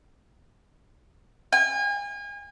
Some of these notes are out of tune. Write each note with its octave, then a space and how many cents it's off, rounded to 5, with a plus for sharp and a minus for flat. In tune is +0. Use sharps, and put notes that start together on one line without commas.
G#5 -35